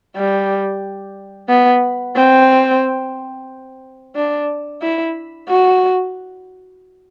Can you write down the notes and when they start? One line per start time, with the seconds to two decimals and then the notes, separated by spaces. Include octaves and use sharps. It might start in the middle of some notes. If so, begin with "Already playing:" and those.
0.16 G3
1.49 B3
2.16 C4
4.16 D4
4.82 E4
5.49 F#4